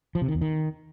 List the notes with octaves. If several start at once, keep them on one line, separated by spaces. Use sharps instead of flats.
F3
C3
D#3
E2
D#3